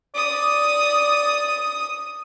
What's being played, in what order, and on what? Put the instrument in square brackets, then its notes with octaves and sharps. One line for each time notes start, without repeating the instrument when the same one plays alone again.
[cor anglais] D5 [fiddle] D#6